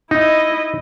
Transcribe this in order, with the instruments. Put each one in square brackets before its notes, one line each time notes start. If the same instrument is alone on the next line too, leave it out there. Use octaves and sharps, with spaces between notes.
[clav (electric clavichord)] D#4 [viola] E4 D#5